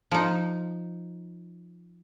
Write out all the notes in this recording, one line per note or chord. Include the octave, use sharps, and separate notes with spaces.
F3 D#4